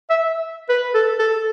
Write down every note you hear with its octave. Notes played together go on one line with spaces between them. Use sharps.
E5
B4
A4
A4